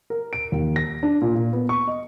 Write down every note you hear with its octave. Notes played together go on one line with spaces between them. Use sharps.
A#4
D7
D#2
A#6
D4
A#2
A#2
B3
C#6
D#5